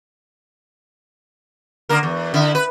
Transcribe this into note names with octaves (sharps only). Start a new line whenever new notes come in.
D3 A#3 A#4
E2
D3 E4
B4